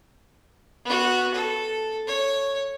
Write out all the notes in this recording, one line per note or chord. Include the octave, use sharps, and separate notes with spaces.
B3 F#4
A4
C#5